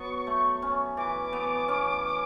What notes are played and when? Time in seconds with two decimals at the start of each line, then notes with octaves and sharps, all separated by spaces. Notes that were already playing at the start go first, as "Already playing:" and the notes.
Already playing: F#3 B3 C#6
0.27 A3
0.62 C#4
0.97 E3 D6
1.33 B3
1.68 C#4